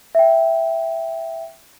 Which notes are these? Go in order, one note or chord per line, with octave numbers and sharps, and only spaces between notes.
E5 G5